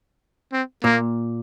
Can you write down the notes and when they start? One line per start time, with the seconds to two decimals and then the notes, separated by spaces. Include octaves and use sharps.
0.53 C4
0.84 A#2 A#3